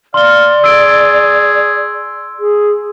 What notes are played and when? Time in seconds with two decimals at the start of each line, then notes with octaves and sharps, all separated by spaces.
0.14 D5 F5 C6 G7
0.64 G#4 E6 D7
2.40 G#4